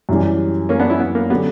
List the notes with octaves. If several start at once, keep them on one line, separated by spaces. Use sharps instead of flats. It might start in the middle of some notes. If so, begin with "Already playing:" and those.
F#2 E3 G3
A#3 C#4
B3 D4
C#4 E4
B3
A#3
D3 F#3 B3 C#4 G4